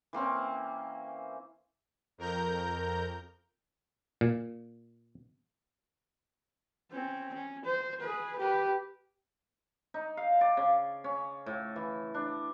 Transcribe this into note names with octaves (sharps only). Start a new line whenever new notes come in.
E3 A#3 C4 C#4
F2 A#4 A#5 G6
A#2
C4 C#4
C#4
C5
G#4 B4
G4 B4
D#4
F5
D5
C#3
C#4
A2
E3
D4